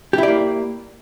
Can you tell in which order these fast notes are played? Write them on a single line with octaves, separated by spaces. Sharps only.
G4 E4 D5 A#3